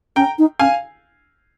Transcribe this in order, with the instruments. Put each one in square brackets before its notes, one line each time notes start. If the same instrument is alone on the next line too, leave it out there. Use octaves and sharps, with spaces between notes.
[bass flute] C#4 [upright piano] G5 A#5
[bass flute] D#4
[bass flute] C#4 [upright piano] F5 G#5